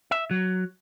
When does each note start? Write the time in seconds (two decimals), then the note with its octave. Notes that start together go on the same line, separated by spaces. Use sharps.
0.11 E5
0.31 F#3